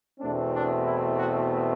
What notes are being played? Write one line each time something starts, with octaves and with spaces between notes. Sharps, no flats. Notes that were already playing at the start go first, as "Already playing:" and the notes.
E2 B2 A3 C4 D4
D4
E4
F#4